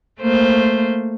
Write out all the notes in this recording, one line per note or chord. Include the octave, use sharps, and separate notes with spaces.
A3 A#3 C5